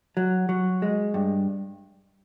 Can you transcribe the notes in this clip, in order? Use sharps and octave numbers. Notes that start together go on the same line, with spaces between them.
F#3
F#3
G#3
G2